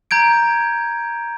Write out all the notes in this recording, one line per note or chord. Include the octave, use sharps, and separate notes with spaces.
A#5 G6 G#6 D7